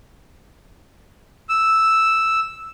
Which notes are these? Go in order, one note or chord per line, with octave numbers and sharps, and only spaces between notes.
E6